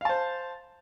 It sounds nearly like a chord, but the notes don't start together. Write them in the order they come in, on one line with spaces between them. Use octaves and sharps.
F5 A5 C5